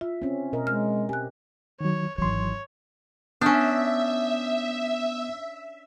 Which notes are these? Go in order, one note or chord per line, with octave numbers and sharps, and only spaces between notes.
F4 E5
C4 C#4
B2 A#4 D#5
G#3 A#4 F6
G4 G#5 F#6
D#3 F#3 C#5
G#1 E3 F#3 C#5 C6
B3 C#4 D4 E5 D#6 G6